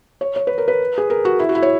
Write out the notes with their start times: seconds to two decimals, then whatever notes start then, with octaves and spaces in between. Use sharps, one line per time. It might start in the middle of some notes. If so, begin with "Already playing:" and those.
0.21 C#5
0.36 C#5
0.47 B4
0.58 A#4
0.68 B4
0.98 G#4
1.10 A#4
1.25 F#4
1.39 E4
1.49 F#4
1.55 E4
1.63 C#5